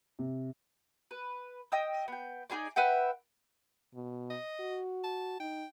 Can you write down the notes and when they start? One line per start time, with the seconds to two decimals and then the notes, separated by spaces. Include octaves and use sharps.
0.19 C3
1.11 B4
1.72 D#5 G5 D#6 E6
2.08 B3 G5
2.50 D#4 F4 G#4 D5
2.76 B4 E5 F#5 G5
3.94 B2
4.30 D#5
4.60 F#4
5.04 A5
5.40 D#4 G5